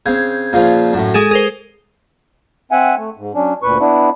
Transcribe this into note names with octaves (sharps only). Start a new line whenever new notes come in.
C#3 C4 G6 G#6
A#2 C#3 F3
F#2 A2
G#3 G#4 A4 G#5
G#4 A#4 C5 D#6
C4 E5 F#5 G#5
A3
G#2
F#3 C#4 D4
D2 A#2 B4 C#6
B3 D4 E4